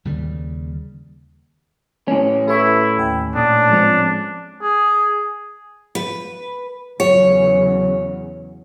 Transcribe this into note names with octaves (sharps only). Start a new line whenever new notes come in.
D#2 C#3 G3
A2 C#4
E4 A4 B4 C#6
D#2 G5
A#2 A3 D4 D#6
F3 G#3 C4
G#4
B4
E2 C#3 F#3 C#5